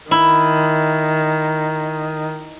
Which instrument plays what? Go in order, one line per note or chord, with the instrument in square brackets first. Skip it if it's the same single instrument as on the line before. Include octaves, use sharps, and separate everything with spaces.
[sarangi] D#3 [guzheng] E4